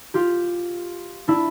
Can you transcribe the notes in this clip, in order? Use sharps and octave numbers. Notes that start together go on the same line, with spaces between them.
F4 G4
D4 E4